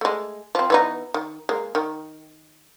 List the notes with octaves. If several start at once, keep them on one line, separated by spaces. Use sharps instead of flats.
G#3 A3
F3 C4
E3 B3 D#4
D#3
G#3 A#3
D#3